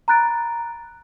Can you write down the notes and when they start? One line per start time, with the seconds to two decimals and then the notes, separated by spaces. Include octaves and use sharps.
0.08 A#5 B5 F#6 A6 D7